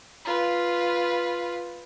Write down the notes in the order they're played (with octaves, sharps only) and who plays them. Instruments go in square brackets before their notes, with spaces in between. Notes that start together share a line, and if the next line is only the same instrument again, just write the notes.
[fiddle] F4 B4